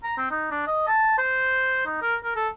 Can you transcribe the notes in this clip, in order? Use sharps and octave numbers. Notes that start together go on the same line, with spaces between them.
A#5
C4
D#4
D4
D#5
A5
C5
D#4
A#4
A#4
A4